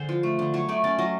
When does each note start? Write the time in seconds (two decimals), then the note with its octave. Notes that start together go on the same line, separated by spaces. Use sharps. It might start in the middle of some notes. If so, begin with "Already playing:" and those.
Already playing: D3 G#4 C5
0.09 F3
0.23 A3
0.39 D3
0.54 F#3 C#5
0.69 A3 D5
0.84 C#4 D5
0.98 F#3 D#5